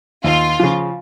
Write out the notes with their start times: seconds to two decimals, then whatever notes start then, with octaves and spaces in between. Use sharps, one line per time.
0.24 D#2 F4
0.59 C#3 F3